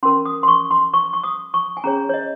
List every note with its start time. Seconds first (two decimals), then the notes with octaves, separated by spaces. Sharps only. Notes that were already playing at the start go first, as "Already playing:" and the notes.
0.03 C#4 F#4 A#4 C6
0.26 D#6
0.43 C6
0.48 C#6
0.71 C6
0.94 C#6
1.13 C#6
1.24 D#6
1.54 C#6
1.77 G#5
1.84 C#4 G#4 C#5 A#5
2.09 C#5
2.14 D#5